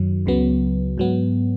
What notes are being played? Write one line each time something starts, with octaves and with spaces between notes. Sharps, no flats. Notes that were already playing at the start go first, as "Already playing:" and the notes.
Already playing: F#2 D#3 F#3
C#2 C#3 F#3 B3
G#2 F#3 B3